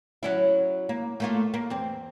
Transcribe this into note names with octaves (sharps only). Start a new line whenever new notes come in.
F#3 C#4 E4
A#3
A3 A#3 F4
A#3
E2 C4